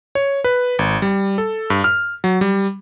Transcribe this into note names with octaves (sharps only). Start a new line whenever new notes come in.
C#5
B4
G#1
G3
A4
G2
F6
F#3
G3